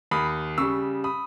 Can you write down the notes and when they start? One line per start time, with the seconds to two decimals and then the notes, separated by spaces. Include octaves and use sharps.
0.11 D#2 B5 D#6
0.58 C#3 G3 C#6 E6
1.04 B5 D#6